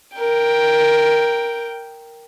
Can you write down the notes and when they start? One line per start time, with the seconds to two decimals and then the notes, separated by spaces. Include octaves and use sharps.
0.16 A#4 G5